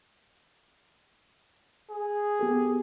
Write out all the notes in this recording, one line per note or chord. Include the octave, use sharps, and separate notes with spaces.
G#4
B3 G4 A4